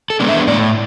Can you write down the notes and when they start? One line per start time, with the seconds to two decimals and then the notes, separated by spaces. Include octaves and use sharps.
0.10 A4
0.20 G#3 B3 D4
0.29 E5
0.47 A2 D5